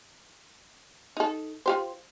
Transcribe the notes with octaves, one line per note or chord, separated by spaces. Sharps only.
D#4 A4
F4 G4 C5